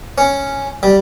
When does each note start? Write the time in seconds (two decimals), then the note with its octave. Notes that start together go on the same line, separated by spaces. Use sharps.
0.18 C#4
0.83 G3